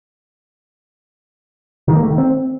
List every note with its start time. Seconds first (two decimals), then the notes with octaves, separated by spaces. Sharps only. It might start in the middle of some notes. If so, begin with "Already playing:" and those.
1.88 D#3
1.95 A#3
2.03 A3
2.10 D#3
2.18 C4